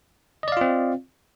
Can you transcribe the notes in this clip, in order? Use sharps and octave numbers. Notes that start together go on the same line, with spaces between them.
C4 F4 D5 D#5 F5